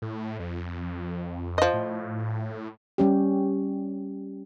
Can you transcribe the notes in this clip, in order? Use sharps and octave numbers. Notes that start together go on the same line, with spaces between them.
A2
F2
F3 D#5
A2
G3 C#4 G4